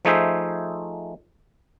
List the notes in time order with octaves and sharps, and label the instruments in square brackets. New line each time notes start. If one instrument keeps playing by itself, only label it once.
[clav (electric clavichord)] F3 A3 D#4 G#4 C5 E5